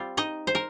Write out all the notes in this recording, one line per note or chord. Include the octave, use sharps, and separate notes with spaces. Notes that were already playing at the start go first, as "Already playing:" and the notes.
Already playing: G3 C4 F4
D#4 D#5
C5
A#4